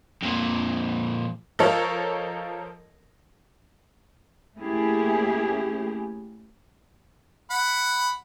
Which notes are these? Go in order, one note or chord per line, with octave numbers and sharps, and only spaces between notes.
F2 A#2
F3 F4 A4 A#4 C#5 D#5
A3 A#3 C#4 E4 G4 G#4
F#5 B5